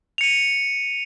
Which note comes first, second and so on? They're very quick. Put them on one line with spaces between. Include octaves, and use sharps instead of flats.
F7 C#7 D#7